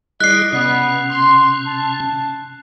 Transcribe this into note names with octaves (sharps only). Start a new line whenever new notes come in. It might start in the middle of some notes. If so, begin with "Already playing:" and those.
G3 E4 G#4 D5 D#5 F#6 C7
C3 B3 C#4
C6
A5